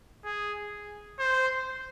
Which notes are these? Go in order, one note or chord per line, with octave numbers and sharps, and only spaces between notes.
G#4
C5